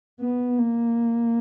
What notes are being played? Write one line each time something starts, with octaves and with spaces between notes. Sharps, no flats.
B3
A#3